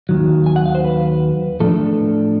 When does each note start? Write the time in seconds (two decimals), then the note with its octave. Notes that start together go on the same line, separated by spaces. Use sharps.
0.09 D#2 D#3 F#3
0.46 G#5
0.56 F#5
0.66 F5
0.75 C5
0.84 B4
1.60 A2 F3 A3 D4 A4